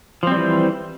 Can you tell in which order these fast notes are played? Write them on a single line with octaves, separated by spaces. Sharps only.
F3 C4 G3 E3